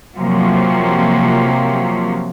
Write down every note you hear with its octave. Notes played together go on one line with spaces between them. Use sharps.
C3 F3 F#3 A#3